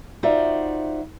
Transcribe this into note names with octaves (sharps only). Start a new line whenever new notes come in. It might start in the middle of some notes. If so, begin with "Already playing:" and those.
D#4 F4 F#4 C5 D5 E5